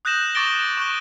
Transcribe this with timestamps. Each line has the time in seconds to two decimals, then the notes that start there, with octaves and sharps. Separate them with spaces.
0.05 D#6 F#6 G6 A#6 E7 F#7
0.35 C#6 D6 A6 A#6 D7 G7
0.62 E7
0.77 C#6 F#6 G7